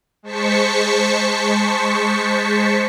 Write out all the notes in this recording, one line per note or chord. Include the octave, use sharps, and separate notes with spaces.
G#3 C5 A5 C#6 B6 C#7